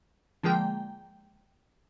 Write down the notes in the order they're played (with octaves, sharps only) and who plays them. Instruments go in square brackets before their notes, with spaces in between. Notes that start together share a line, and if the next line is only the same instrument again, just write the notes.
[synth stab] D3 F3 G#3 A#3 G5